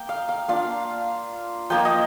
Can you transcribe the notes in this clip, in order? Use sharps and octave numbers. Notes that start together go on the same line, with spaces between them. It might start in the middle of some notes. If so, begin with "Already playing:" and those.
Already playing: A#3 G5
F5
F5
A#3 D4 F4 F5
F3 A#3 D#4 G5
D#5